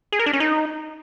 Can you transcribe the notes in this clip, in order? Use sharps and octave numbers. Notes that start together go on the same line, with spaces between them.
G#4
A#4
D4
C#4
D#4